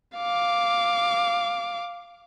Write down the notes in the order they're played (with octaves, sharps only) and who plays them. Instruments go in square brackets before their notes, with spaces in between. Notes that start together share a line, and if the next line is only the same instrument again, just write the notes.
[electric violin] F5 D6